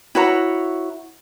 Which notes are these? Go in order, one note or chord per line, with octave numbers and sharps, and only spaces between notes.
E4 F#4 C#5 A#5